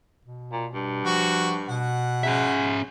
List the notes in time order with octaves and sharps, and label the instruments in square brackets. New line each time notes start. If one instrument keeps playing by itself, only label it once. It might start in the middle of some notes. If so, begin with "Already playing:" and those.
[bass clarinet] B2
[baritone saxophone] A#2
G2
[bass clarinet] F3 [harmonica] F#4
[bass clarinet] B2 [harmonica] F#5
[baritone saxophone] C#3 [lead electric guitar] C#4 E5